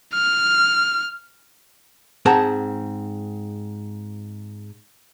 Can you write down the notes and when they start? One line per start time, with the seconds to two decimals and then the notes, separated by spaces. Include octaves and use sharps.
0.14 F6
2.26 G#2 C4 G#4 F#5 A5 A#5